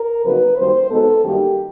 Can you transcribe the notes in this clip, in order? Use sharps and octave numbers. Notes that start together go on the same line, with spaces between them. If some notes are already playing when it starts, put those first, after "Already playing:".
Already playing: A#4
F2 C#3 F#3 A#3 D#4 B4
F#2 D#3 G3 A#3 C5
B2 G#3 B3 D#4 A4
F#2 D#3 G3 A#3 D#4 G4